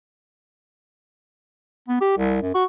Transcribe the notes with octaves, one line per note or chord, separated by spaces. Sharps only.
B3
G4
C2
F#2
F#4